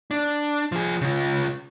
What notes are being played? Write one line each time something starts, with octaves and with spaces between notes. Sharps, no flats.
D4
F3 G#4
C#3 F4